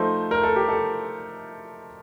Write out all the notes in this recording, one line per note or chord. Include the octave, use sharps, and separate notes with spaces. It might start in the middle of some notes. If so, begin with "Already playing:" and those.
Already playing: F3 A3 D#4 C5
A#4
A4
G4
A4